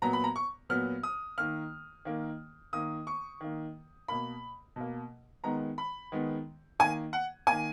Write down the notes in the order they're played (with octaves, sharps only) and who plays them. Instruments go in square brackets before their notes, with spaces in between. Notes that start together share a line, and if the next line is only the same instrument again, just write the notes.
[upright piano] A#2 F#3 B3 A#5
B5
A#5
C#6
A#2 F#3 B3 F6
D#6
D#3 A#3 F6
D#3 A#3
D#3 A#3 D#6
C#6
D#3 A#3
B2 A#3 B5
B2 A#3
D#3 G#3 B3 A#5
B5
D#3 G#3 B3
D#3 A#3 G#5
F#5
D#3 A#3 G#5